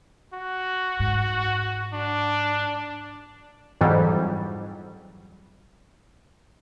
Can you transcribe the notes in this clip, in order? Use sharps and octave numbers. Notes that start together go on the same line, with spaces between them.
F#4
G#2
D4
F2 G#2 E3 F#3 G3